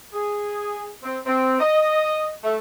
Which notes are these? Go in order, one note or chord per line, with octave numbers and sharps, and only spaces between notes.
G#4
C4
C4
D#5
A3